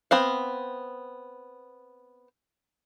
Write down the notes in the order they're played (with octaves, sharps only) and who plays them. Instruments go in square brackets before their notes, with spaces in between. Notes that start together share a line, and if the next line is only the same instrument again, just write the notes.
[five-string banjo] B3 C4 F5